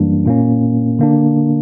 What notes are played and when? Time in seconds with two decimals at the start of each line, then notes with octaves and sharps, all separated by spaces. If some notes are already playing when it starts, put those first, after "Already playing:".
Already playing: F#2 E3 G3 A#3 D4
0.26 A#2 A#3 C#4
0.99 D3 A#3 D4